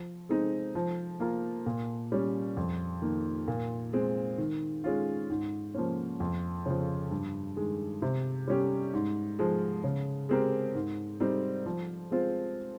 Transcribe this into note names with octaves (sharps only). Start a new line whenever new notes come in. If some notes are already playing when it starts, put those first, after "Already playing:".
Already playing: F3
G#3 C4 D#4
F3
A#3 F4 A#4
A#2
G3 C#4
F2
D#3 A#3
A#2
G#3 C4
D#3
G#3 C#4 F4
G#2
F3 A#3 C#4
F2
C#3 F3
G2
D#3 G#3
C3
G3 C#4 G4
G#2
F3 G#3
C#3
G#3 C4 G4 A#4
G#2
G3 C4 D#4
F3
G#3 C4 F4 C5